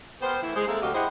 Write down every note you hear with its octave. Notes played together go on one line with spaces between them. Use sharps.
B3 G4 A#4 C5
E3 A3 E4
G#3 G#4 C5
G#3 A#3 C4 A4 A#4 E5
D2 F#3 F#4 G4 D#5 F5
E4 G4 G#4 C5 D#5 F#5